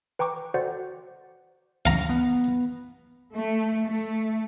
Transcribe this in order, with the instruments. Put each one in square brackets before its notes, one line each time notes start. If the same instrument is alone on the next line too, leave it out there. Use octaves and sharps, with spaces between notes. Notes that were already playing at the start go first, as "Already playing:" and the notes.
[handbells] B4 G5 A#5 C#6 D6
F#4 A4 C5 D5 F#5
[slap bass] C#2 F#2 [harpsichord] F5 A#5
[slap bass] B3
[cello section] A3
A3